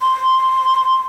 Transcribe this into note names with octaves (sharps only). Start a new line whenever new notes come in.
C6